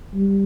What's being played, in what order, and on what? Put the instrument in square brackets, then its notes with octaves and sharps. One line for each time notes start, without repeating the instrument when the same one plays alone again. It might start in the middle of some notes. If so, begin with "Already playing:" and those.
[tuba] G3